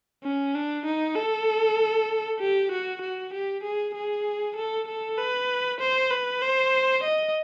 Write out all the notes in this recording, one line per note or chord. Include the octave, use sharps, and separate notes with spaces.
C#4
D4
D#4
A4
G4
F#4
F#4
G4
G#4
G#4
A4
A4
B4
C5
B4
C5
D#5